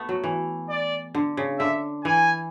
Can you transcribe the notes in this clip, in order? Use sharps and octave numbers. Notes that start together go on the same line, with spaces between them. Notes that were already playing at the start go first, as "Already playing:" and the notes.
Already playing: A3 B3
F#3
E3
D5
D3
C#3
D3 E5
E3 G#5